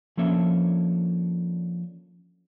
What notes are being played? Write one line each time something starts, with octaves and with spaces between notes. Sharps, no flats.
F3 A#3 C#4 D4 A4 E5